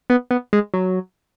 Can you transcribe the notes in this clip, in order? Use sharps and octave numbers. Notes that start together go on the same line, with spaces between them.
B3
B3
G#3
F#3